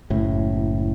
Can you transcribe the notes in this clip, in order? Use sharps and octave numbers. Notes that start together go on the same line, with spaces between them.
F#1 A2